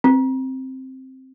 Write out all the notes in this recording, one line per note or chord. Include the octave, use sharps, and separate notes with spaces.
C4